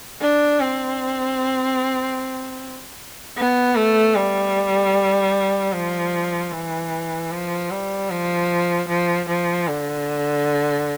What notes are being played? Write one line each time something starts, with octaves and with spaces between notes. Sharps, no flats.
D4
C4
B3
A3
G3
F3
E3
F3
G3
F3
F3
F3
D3